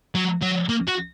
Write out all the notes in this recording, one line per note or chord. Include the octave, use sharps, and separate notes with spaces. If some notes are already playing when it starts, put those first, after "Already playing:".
F#3
F#3
A#3
F#4